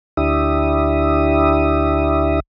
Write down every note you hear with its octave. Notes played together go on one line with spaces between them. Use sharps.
D2 D4 E4 G4 E5 D#6